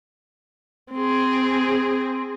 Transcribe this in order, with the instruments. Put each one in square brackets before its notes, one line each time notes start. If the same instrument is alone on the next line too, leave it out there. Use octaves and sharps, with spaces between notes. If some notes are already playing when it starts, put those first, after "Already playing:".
[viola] C4 G#4